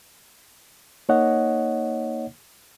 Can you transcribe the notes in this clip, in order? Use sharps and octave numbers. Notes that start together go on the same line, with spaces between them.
A#3 D#4 C#5 D#5 F#5